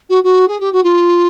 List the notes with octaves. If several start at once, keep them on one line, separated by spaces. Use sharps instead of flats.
F#4
F#4
G#4
G4
F#4
F4